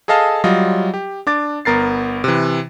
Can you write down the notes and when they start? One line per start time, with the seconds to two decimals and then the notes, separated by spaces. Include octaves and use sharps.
0.08 G#4 A4 D#5 F5 A5
0.44 F#3 G3 F4 D#5
0.94 G4
1.27 D4 D6 A6
1.65 G1 B3 A#4 A6 C7
2.24 C3 E3